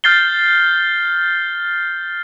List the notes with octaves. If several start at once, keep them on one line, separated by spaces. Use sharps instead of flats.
F6 G6 A6 C7 G7